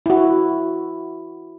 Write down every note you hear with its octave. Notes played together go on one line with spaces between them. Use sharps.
E4 F#4